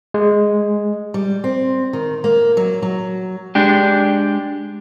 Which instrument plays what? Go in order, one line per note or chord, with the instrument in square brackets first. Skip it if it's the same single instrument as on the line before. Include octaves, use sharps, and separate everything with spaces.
[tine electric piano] G#3
[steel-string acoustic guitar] G3
C4
D#3
A#3
F#3
F#3
[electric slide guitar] G#3 D4 G4